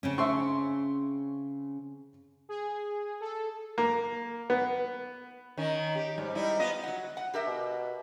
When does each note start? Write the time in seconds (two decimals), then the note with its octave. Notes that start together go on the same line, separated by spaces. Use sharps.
0.03 C#3 C4 C#4
0.18 E5 C6 C#6
2.49 G#4
3.21 A4
3.78 A#3
4.50 B3
5.58 D#3 C#4
5.95 G4
6.18 G#2 G3
6.35 G3 D#4 E4
6.60 B3 F4 D#5
6.83 F#3 F#5
7.17 F#5
7.34 G4 A#4 E5
7.46 B2